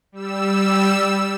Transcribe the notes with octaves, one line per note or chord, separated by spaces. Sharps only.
G3 E6